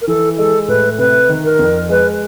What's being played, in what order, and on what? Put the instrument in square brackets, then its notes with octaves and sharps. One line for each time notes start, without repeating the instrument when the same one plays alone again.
[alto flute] A#4
[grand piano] E3 [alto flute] A4
[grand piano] G#3 [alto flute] A4
[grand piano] A2 [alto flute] B4
[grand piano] C3 [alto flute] B4
[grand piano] D#3
[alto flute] A#4
[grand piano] F2
[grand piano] G#3 [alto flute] B4